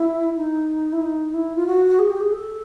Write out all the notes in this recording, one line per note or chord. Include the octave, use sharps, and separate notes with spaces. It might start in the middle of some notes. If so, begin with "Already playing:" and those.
Already playing: E4
D#4
E4
D#4
E4
F4
F#4
G#4
G4
G#4
A4